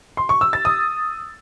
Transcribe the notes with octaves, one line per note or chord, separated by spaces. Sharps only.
C6
C#6
E6
A6
D#6